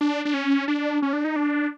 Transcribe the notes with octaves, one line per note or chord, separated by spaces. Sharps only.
D4
D4
C#4
D4
C#4
D4
D#4
D4